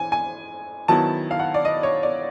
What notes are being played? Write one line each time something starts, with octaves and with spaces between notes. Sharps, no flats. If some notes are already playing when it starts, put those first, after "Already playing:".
Already playing: E3 G#5
G#5
D#3 F#3 B3 E4 A5
F5
F#5
D5
D#5
C#5
D5